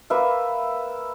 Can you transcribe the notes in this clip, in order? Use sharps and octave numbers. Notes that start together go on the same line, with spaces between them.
A#3 B4 E5